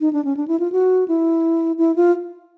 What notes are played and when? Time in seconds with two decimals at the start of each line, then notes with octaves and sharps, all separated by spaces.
0.01 D#4
0.13 D4
0.25 C#4
0.37 D4
0.48 E4
0.60 F4
0.72 F#4
1.08 E4
1.78 E4
1.96 F4